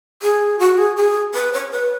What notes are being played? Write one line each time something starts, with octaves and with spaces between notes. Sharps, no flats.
G#4
F#4
G#4
G#4
B4
C#5
B4